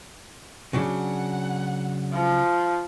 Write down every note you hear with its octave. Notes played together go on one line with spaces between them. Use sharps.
C#3 F#3 D4 F#5
F3